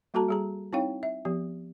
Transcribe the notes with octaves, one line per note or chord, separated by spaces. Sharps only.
G3 A#3 F#4 A4 A5 A#5
G3 G#4 A#5
C4 D#4 E4 C#5 F5 G5
E5
F3 B3 G4